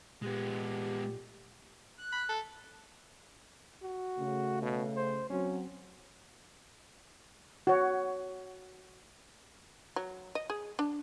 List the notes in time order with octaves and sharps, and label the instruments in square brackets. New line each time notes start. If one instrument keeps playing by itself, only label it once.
[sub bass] A#2 [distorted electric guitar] G#3 B3 [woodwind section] G4
[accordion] F#6
[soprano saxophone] B5
A4
[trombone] F#4
[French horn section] C#3 A3
[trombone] B2
C5
[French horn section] F#3 C4 [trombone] C#4
[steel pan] F#4 C#5
[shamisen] F#3
D#5
G#4
D4